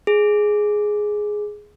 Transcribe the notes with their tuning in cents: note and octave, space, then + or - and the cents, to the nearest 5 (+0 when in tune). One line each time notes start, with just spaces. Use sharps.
G#4 +5